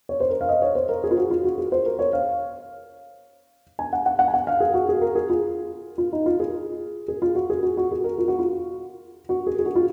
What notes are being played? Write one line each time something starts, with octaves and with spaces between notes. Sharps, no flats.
C#5
C5
A#4
F5
D#5
C#5
C5
A#4
G#4
F4
F#4
F4
F#4
G#4
C5
A#4
C#5
F5
G#5
F#5
F#5
F#5
G#5
F#5
F5
G#4
F#4
G#4
A#4
G#4
F4
F4
D#4
F4
G#4
G#4
F4
F#4
G#4
F#4
F#4
G#4
A#4
F4
F#4
F4
F#4
G#4
G#4
F#4
F4